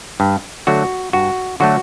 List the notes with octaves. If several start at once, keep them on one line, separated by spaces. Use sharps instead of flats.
G2
D3 F#3 A3 F#4
G2 F#4
D3 F#3 A3 F#4